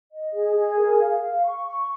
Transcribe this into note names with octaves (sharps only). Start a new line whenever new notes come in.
D#5
G#4
G#4
A#4
F5
F5
C#6
C#6